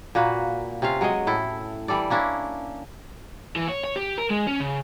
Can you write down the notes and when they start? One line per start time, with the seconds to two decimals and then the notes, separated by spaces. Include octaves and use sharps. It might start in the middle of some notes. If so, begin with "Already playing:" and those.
0.15 A#2 A#3 F#4 B4
0.82 C3 C#4 F4 F5
1.01 F#3 G#3 C#5 D#5
1.27 A2 E4 A4
1.88 E3 G3 A4 D5
2.10 A#3 C#4 D4 E4
3.56 E3
3.68 C#5
3.84 C#5
3.96 G4
4.18 A#4
4.31 G#3
4.47 C#4
4.60 C#3